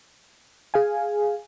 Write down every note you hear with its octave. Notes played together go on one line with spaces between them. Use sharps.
G#4 F5 G#5